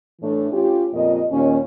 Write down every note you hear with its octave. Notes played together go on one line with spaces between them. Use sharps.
A2 E3 A3 D4
C#4 F4 G4
F2 A#2 D#5
D#2 A#2 C#4